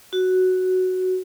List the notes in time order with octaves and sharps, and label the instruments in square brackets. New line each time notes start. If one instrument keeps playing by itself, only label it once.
[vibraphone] F#4